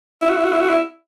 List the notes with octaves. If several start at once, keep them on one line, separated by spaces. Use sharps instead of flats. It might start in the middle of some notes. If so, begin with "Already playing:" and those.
E4
F#4
E4
F#4
E4
F#4
E4